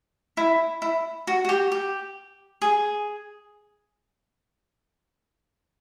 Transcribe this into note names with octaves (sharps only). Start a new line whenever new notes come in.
E4
E4
F#4
F#4
G4
G4
G#4